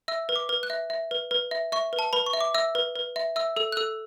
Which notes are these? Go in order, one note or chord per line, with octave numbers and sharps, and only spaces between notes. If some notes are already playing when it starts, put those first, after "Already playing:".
E5 E6
B4
D6
B4
F#6
E5
E5
B4
B4
E5
E5 C#6
B4
A5
B4 B5
C#6
E5
D6
E5 E6
B4
B4
E5
E5 E6
A4 E6
F#6
A4 E6